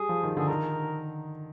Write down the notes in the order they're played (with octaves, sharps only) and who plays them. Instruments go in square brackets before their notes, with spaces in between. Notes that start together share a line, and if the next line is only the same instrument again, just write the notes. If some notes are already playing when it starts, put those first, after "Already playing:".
Already playing: [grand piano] G3 [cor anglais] G#4
[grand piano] F3
D#3
[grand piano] D3 [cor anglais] G#4
[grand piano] D#3 [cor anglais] A#4